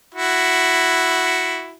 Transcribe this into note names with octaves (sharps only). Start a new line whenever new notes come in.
E4 F#4